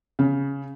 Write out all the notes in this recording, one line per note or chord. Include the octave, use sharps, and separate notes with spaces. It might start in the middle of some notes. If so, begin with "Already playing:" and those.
C#3